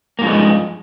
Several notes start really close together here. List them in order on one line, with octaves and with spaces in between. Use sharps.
A#3 G2 F3 G#3